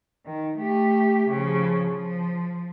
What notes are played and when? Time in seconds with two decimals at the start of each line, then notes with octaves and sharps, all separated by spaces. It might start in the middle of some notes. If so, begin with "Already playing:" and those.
0.26 D#3
0.59 A3 G4
1.30 C#3 F3
1.90 F3